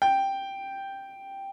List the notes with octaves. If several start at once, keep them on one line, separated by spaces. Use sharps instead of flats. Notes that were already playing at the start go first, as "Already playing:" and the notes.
G5